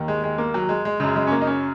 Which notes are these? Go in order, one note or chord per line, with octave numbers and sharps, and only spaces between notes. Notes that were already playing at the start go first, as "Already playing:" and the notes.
Already playing: D#2 D#3
G#3
G#3
A#3
F#3
G#3
G#3
F#2 C#3 G#3
G#3
C#4
A#3
D#4
C#4